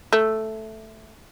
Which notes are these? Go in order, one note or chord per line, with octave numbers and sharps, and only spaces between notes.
A3